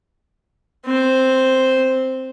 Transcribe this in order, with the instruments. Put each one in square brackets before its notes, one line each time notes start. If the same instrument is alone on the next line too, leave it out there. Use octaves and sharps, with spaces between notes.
[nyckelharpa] C4 C5